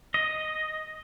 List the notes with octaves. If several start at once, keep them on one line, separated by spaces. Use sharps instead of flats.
D#5